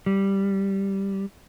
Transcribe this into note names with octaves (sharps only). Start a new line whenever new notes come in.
G3